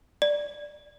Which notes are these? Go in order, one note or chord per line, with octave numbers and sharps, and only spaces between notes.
D5